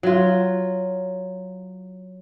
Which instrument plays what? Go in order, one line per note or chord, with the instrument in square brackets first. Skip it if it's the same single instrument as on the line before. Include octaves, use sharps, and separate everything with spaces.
[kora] F#3 F4